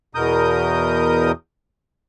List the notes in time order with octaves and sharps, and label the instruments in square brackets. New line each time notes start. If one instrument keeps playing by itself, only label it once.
[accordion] E2 B2 A#4 D#6 G6